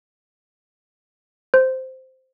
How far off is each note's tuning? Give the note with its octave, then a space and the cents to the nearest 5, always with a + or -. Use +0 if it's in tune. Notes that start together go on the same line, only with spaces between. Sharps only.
C5 -5